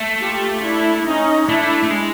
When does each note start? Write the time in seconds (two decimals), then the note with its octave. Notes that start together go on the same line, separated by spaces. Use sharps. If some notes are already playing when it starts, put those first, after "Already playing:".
Already playing: A3
0.22 F4 G4
0.64 D4 E4
1.07 C#4 D#4
1.49 A3 D4 E4
1.84 A3
1.91 G#3